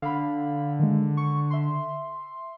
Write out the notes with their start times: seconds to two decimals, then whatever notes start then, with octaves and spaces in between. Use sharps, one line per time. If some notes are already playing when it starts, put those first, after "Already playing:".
0.02 D3 F5 B5
0.79 D#3 G#3
1.17 C#6
1.50 E5 C6